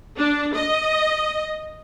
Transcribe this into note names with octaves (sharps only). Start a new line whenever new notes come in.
D4
D#5